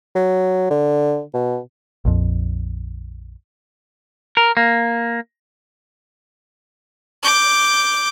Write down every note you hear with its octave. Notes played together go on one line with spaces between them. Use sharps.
F#3
D3
B2
A#1 F2
A#4
A#3
D6 G6